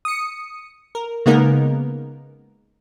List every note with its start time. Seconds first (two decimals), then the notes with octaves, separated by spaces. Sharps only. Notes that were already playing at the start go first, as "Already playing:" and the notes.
0.05 D#6 C#7
0.95 A#4
1.26 C#3 G#3 A#3 B3 D#4 A#4